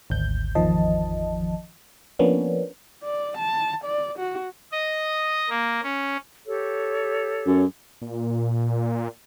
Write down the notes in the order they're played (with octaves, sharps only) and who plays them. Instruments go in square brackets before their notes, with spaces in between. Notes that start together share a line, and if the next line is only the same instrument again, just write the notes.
[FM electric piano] G#1 D2 G6
G#1 E2 D#3 F3 D#5 A5
F3 A#3 B3 C#4 D4
[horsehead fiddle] D5
A5
D5
F#4
[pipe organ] D#5
A#3
C#4
[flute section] G4 A4 C#5
[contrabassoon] F#2
[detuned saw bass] A#2